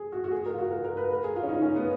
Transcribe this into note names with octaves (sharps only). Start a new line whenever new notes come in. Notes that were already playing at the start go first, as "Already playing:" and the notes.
Already playing: G#4
F#4
F#4
G#4
A#4
F4
F#4
A#4
A#4
B4
A#4
G#4
F4
C#4
D#4
C#4
B3